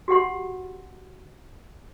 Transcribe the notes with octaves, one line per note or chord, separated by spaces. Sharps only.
F#4 G4 F#5 C6